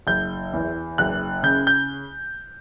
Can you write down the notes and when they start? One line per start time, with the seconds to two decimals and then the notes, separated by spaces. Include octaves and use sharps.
0.07 F#1 G6
0.53 E2
0.98 F#1 F#6
1.43 C#3 G6
1.67 G6